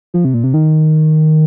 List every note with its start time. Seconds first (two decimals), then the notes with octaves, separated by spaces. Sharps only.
0.14 F3
0.25 C3
0.34 A#2
0.44 C3
0.54 D#3